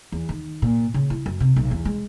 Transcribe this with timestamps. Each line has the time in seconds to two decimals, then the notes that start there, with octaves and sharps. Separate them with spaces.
0.12 E2
0.29 D#3
0.62 A#2
0.94 C#3
1.10 E4
1.26 F#2
1.40 C3
1.56 B1
1.71 E2
1.85 G#3